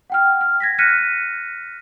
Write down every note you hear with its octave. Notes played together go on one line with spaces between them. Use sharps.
F#5 G5 F6
F6
G#6 A#6 B6
F6 F#6 A#6 B6 C#7 D#7